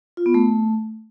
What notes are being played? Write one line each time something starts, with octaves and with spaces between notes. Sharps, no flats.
F4
B3
A3